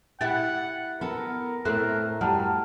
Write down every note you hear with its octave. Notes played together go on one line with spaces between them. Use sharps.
E4 G4 F#5 A6
B3 A4 A#4
A2 A3 C4 A#4 F#6
F#2 G3 F#5 A5 A#5 F6